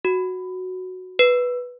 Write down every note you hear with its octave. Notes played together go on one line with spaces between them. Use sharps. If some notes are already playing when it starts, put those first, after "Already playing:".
F#4
B4